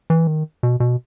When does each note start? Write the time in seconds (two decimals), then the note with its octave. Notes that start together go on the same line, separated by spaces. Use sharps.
0.10 E3
0.27 D#3
0.63 B2
0.80 B2